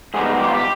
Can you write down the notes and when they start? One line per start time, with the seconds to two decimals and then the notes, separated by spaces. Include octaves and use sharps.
0.14 G#2 G3 B3 D#4 G#4
0.39 G4
0.47 F4
0.54 G4